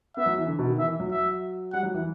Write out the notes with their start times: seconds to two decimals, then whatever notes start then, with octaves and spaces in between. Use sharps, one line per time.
0.17 B3 E5
0.26 F#3
0.38 E3
0.47 D3
0.59 B2
0.68 D#3
0.78 E3 E5
1.00 F#3
1.11 E5
1.72 G3 F#5
1.83 F#3
1.94 E3